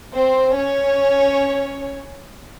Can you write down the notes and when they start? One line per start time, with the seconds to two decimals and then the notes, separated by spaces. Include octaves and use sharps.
0.14 C4 C5
0.57 C#4 C#5